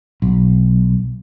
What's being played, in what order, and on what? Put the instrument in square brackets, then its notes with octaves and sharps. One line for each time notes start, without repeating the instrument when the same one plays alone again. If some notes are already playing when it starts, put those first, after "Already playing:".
[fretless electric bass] B1